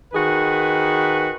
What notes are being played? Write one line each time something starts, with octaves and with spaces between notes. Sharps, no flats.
D#3 F#4 G#4 B4